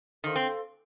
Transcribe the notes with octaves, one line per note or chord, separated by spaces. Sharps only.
D#3 A4 C5 F5 C6
C4